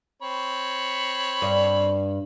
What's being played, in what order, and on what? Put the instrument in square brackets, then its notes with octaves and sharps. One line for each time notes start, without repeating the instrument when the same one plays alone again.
[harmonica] C4 C#5 B5
[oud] G2